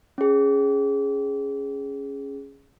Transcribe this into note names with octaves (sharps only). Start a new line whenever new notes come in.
C#4 G#4